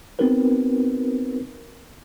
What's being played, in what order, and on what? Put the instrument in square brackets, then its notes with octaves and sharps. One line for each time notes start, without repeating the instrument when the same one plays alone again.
[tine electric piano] B3 C4 D#4 F#4 A#4 B4